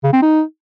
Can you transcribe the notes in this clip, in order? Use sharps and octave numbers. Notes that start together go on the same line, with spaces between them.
C#3
C4
D#4